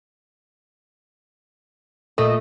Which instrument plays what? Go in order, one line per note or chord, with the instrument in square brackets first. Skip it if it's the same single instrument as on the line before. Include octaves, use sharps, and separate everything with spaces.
[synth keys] A#2 D#5 E6 [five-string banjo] A3